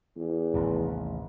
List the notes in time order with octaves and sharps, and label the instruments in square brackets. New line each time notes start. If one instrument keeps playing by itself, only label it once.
[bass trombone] E2
[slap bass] A1 D#2 C3